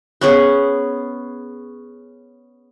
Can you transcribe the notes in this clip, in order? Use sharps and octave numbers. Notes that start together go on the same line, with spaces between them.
B3 C#4 G#4